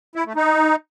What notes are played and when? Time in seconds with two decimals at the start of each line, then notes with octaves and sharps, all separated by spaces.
0.16 E4
0.26 A3
0.36 D#4